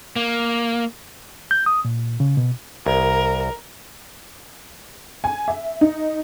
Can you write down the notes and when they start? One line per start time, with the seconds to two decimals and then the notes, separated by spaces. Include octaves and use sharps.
0.16 A#3
1.51 G6
1.66 D#6
1.85 A#2
2.20 C#3
2.37 B2
2.86 C2 A#4
5.24 G#5
5.48 E5
5.81 D#4